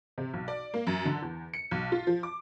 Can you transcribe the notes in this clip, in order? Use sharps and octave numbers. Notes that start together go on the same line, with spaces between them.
C3
B1
D5
A#3
F#2
D3
E2
C#7
B1
F4
F3
D6